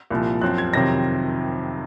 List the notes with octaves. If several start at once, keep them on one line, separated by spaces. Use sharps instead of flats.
C2 A#2 F3
F#2 F3 C4 F#6
G#6
F2 C3 D#3 F#3 C4 A#6